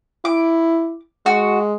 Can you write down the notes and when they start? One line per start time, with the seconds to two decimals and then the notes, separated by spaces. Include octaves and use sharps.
0.25 E4 D6
1.26 G#3 F#4